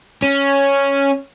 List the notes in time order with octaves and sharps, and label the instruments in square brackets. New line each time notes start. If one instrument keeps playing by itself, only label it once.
[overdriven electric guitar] C#4